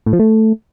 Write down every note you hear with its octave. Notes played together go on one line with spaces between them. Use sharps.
A2
F3
A3